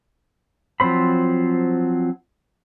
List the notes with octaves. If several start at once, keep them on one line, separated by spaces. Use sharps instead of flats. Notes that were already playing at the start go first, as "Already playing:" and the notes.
F3 F#3 C4 C5 B5